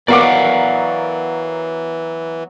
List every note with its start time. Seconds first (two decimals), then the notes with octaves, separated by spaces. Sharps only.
0.08 E3 F#3 B3 A#4 D5 F5 F#5 D6